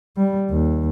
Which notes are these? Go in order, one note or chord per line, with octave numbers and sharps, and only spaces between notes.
G3
D#2